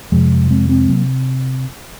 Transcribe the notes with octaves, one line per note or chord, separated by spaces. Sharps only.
F2 C3 F3 G#3
G#3 C4
G#3 C4
C3 F#3 A#3